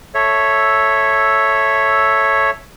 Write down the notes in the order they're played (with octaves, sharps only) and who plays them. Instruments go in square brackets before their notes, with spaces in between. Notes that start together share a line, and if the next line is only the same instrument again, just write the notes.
[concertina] A4 C#5 E5